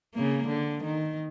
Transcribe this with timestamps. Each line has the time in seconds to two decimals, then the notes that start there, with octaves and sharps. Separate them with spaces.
0.15 C#3 A#3
0.47 D3
0.83 D#3